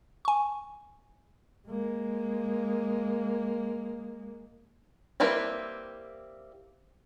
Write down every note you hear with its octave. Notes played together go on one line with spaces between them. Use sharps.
G#5 C#6
G#3 A#3
G3 A#3 C4 E4 B4